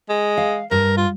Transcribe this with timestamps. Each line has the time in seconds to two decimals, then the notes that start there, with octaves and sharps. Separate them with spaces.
0.09 G#3
0.37 F5
0.71 G2 A#4
0.97 F4